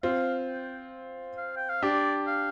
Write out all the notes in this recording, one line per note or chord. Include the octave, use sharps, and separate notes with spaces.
C4 F4 F5
G5
F5
G5
F5
D4 G4 D5
F5